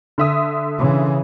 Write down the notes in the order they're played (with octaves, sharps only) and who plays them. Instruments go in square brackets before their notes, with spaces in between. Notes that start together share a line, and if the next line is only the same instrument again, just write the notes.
[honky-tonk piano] D3 E5 D#6
[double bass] C#3 E3